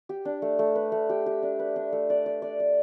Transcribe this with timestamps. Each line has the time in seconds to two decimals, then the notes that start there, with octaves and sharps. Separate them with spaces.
0.09 G4
0.25 D4
0.42 A3
0.59 A3
0.75 B4
0.92 A3
1.09 G4
1.26 G4
1.43 D4
1.59 B4
1.76 D4
1.92 A3
2.10 D5
2.26 D5
2.42 D5
2.60 D5